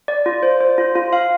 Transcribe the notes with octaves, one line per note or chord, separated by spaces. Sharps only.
D5
F4
C5
C5
F4
F4
F5